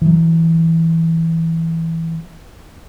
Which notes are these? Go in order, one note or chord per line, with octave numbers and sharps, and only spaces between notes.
E3 F#3